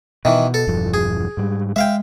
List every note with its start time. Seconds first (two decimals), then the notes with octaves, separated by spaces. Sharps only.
0.25 B2 D#3 E3
0.54 A4
0.67 E1 G2 F3
0.94 G#4
1.37 G#2 G3
1.76 G#3 E5 F5 G5